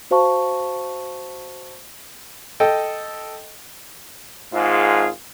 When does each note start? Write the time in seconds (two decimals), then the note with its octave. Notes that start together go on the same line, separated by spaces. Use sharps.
0.11 F#4 C5 F5 A5 C#6
2.60 A4 D#5 G5
4.52 G#1 G#2 F4 G#4